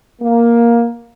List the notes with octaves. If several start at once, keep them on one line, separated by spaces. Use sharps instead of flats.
A#3